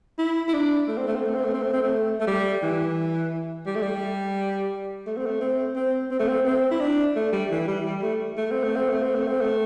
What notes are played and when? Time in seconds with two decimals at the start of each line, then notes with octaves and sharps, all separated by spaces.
0.19 E4
0.48 E4
0.54 D4
0.88 A3
0.98 C4
1.07 A3
1.16 C4
1.25 A3
1.35 C4
1.45 A3
1.54 C4
1.63 A3
1.73 C4
1.83 A3
2.20 A3
2.27 G3
2.63 E3
3.66 G3
3.76 A3
3.83 G3
5.06 A3
5.17 C4
5.26 A3
5.41 C4
5.75 C4
6.11 C4
6.19 A3
6.28 C4
6.46 C4
6.71 E4
6.80 D4
7.16 A3
7.32 G3
7.51 E3
7.68 G3
7.85 G3
8.03 A3
8.37 A3
8.51 C4
8.64 A3
8.76 C4
8.90 A3
9.02 C4
9.15 A3
9.28 C4
9.41 A3